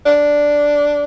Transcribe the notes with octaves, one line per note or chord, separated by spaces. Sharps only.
D4